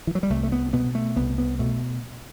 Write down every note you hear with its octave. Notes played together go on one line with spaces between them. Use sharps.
E3
F#3
G3
C2 A3
A3
B3
B2 B3
A3
C2 B3
B3
B2 A3